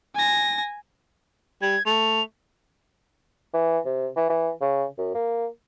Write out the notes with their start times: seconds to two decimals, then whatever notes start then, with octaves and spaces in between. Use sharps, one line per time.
0.15 G#5 A#6
1.62 G3 G#6
1.86 A3 F7
3.54 E3
3.85 C3
4.16 E3
4.30 E3
4.61 C#3
4.98 F#2
5.14 A#3